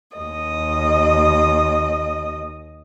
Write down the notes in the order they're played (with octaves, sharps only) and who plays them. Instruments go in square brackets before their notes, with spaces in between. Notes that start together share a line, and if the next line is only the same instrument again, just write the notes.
[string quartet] D#2 D#5